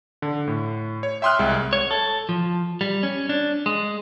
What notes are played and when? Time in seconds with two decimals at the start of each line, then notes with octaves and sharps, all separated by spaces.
0.22 D3
0.47 A2
1.03 C#5
1.22 E5 G5 C6 D#6 F6 F#6
1.39 C2 G#3 E5
1.73 C#5
1.91 A4
2.29 F3
2.81 G3
3.03 C#4
3.29 D4
3.66 G#3